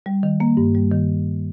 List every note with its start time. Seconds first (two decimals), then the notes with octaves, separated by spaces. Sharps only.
0.06 G3
0.23 D#3
0.40 A#3
0.57 G2
0.75 G3
0.92 D#3